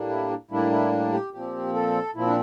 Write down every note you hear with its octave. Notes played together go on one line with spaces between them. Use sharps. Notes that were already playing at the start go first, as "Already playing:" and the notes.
Already playing: A2 G3 A#3 D4
E4
A2 G3 A#3 D4 E4
E4
G4
A#2 F3 C4 G4
A4
A#2 F3 C4 E4
D4